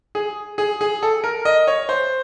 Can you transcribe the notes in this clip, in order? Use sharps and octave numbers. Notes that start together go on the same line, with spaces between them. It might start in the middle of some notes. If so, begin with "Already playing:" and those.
G#4
G#4
G#4
A4
A#4
D#5
C#5
C5